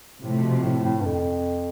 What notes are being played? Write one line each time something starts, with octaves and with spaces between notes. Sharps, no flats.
A2 C3 F3 A3
B2
A2
A2
G2
F2